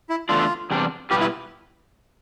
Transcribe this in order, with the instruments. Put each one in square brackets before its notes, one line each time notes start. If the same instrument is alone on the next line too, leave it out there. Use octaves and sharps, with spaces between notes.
[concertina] E4
[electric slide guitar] E2 D3 A3 D4 [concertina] F4
[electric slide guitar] E2 C3 G3 D4
[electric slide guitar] B2 G3 B3 F4 B4 [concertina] G4
[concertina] E4